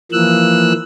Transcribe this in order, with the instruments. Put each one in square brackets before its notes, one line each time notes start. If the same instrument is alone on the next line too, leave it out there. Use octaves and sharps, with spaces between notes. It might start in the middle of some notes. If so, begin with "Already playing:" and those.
[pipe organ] E3 F3 A#3 E6 F#6